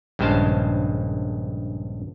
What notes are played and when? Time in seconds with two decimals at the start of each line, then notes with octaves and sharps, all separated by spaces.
0.19 A#1 G2 C#3 G#3 C5 A5